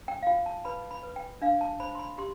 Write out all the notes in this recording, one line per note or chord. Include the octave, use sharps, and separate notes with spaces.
G5
F5
F4 G5
A5
B4 B5
B5
B4
G5
D4 F5
A5
C5 B5
C6
B5
G4 C6